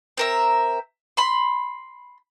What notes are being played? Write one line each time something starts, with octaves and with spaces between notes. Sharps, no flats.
C4 A#4 E5
B5 C6